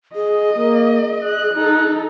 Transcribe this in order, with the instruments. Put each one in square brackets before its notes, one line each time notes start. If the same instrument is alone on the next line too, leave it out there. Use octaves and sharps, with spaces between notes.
[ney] G#4 [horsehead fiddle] D#5
[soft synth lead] A#3 [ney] G#4
[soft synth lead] F#6
[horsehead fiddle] D#4 A4